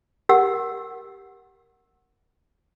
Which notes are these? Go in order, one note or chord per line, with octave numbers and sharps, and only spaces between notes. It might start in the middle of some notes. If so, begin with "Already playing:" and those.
G4 A#4 F#5 E6